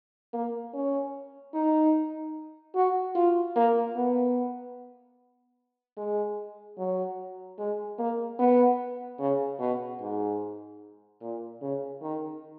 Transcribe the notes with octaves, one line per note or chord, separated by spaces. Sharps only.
A#3
C#4
D#4
F#4
F4
A#3
B3
G#3
F#3
G#3
A#3
B3
C#3
B2
G#2
A#2
C#3
D#3